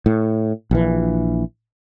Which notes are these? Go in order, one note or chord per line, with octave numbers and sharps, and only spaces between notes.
A2
A#1 E3